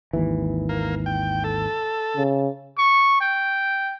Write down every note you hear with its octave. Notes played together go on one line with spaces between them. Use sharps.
G#1 D#2 E3
A#3
G5
A4
C#3
C#6
G5